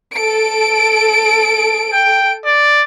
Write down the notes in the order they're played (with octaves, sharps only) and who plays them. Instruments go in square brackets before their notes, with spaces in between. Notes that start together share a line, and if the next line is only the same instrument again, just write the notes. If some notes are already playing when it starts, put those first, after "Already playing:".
[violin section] A4 D7
[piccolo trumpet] G5
D5